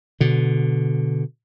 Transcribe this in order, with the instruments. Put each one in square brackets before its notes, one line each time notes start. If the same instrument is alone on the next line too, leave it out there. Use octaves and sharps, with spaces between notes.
[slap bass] B2 D3